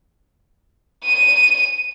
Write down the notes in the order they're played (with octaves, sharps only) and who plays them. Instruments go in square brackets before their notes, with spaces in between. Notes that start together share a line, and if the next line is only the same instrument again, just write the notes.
[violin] D#7